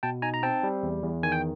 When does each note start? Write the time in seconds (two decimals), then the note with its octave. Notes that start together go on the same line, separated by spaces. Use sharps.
0.03 B2 G5 A5
0.22 D#4 G#5 A#5
0.34 A#5
0.43 C4 G5 A5
0.63 G3
0.83 E2
1.03 E2
1.23 D#3 G#5
1.32 G5